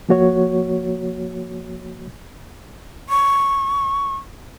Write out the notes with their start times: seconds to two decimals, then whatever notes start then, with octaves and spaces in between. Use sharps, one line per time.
0.09 F3 A#3 F#4 C#5
3.09 C#6